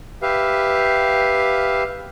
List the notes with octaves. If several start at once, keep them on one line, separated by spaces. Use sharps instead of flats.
G4 B4 E5 F5